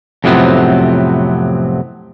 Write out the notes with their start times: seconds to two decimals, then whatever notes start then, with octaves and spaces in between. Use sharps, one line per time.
0.24 F2 A2 C3 F#3 B3 C4